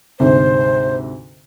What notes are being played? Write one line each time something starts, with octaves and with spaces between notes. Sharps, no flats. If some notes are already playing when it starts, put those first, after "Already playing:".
D2 G#2 C3 C5